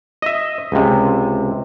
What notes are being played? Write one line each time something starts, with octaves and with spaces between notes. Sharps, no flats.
D#5 E5
C#2 C3